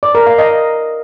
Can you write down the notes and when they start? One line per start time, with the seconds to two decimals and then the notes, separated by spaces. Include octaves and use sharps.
0.03 D5
0.15 A#4
0.27 F5
0.38 D#5